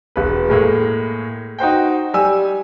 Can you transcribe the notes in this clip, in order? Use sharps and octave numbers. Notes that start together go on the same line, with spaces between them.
E1 B4
A2 G#3 A#3
D#4 F#4 C5 G5
G3 G#5 E6